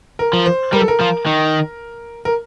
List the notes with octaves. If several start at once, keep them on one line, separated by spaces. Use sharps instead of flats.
A#4
F3
C5
G3 A#4
A4
A#4
F3
D#3
A#4